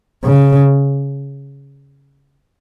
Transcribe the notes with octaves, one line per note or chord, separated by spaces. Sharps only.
C#3